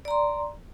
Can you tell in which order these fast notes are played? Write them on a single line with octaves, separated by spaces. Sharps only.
D5 A#5 C6